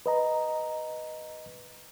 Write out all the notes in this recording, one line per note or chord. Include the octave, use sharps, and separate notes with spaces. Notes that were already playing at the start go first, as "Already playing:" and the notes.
B4 D#5 A#5